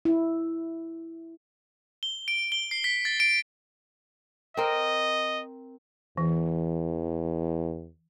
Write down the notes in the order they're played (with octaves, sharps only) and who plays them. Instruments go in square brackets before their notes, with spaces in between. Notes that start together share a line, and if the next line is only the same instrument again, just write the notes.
[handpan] E4
[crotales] G7
D7
G7
C7
B6
A6
D7
[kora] C4 A#4 [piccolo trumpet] D#5
[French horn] E2 [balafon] E3